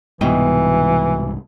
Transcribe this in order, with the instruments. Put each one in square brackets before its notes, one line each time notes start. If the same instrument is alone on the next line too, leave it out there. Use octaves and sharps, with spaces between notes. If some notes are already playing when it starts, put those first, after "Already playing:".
[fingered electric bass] C2 G#2 [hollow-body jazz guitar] B2 D#5 G5 [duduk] E3